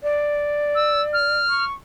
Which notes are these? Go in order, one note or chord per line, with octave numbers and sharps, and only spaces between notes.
D5
E6
F6
C#6